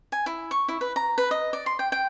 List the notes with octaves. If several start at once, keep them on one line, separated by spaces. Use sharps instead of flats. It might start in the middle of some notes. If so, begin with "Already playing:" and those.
G#5
E4
C#6
E4
B4
A#5
B4
D#5
D5
C6
G5
G5